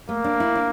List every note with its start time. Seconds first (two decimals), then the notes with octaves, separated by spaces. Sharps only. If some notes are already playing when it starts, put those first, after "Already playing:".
0.09 A3 A#3
0.24 D4
0.40 E4
0.56 D4